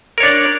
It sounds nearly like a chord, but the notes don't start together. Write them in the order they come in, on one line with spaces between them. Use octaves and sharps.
A#4 C#5 D4 D5